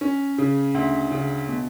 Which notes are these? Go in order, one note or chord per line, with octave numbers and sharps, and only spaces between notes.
C#4
C#3
D2
C#3
B2